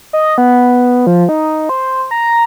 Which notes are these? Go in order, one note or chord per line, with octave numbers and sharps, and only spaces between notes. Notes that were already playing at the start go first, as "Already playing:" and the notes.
D#5
B3
F3
D#4
C5
A#5